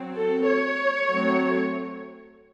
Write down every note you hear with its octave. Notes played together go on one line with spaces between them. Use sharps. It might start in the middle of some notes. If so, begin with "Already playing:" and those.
Already playing: F#3 C4
A4
C#5
F#3 A3 C4